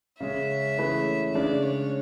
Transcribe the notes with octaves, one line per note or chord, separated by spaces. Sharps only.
C#3 G#3 C#4 E5
E3 A3 C#4 G#4 B4
C#3 G#3 D4 D5
C#5